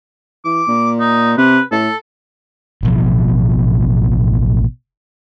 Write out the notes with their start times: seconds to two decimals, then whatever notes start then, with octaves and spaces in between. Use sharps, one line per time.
0.45 E3 D6
0.68 A#2
1.00 D#4
1.38 C3 B4
1.72 A2 A4
2.83 A1 B2 F3